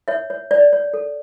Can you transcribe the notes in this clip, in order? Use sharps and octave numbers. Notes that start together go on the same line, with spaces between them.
C#5 E5
C#5
C#5 D5
C#5
A4